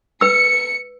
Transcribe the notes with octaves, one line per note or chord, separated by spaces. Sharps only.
B4 E6 C#7